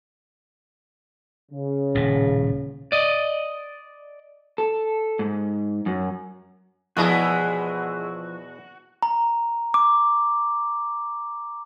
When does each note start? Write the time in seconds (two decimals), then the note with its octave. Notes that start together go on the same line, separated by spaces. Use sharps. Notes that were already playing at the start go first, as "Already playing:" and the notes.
1.52 C#3
1.95 D#1 A2
2.92 D5 D#5
4.58 A4
5.19 G#2
5.86 F#2
6.97 E2 B2 F3 G#3 E4 F#4 G#4 D#5
9.03 A#5
9.74 D6